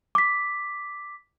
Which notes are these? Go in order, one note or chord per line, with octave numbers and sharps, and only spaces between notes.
D6 B6